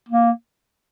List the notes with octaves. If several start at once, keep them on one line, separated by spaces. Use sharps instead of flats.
A#3